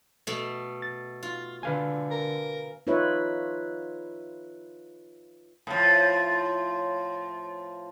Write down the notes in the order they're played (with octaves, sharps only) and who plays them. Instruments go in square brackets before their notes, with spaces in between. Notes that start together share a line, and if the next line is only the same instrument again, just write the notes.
[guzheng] B2 A3
[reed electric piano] A6
[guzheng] F4
[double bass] D3 [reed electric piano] B4 F5 G#5
[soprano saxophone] A#4
[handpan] D#4 F4 B4 C#5 E5
[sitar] A2 F3